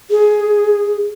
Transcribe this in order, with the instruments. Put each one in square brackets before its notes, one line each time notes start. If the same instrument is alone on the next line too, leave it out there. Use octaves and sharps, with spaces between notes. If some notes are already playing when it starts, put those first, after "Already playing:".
[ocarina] G#4